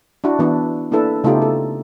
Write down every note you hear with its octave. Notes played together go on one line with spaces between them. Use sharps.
D4 E4 F#4
E3 B3 D4 E4
A#3 D4 E4 A4 B4
C#3 A3 B3 D#4 F4 G4
A4